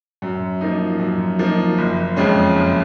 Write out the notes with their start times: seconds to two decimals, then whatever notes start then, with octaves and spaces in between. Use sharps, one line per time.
0.22 F#2
0.61 F3 A#3 D#4
0.99 F#2
1.39 F3 A#3 D#4
1.78 F#1
2.16 F2 F3 G#3 C#4
2.56 F#1